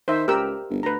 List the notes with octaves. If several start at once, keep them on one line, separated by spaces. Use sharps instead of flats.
D#3 C5 E5
C#2 G4 A#4 E6
G1
D2 B4 A#5